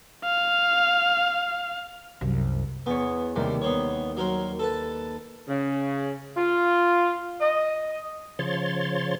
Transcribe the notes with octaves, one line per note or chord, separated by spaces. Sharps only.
F5
C2 F#2
E2 B3 C#5
D#2 C3 G3 A#3
B3 C5 C#5
F#3 A#4 C5
A4 B4 A5
C#3
F4
D#5
C#3 F3 C#5 C6 A6